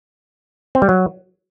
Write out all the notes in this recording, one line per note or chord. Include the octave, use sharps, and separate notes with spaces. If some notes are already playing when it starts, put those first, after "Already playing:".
C4
G3
F#3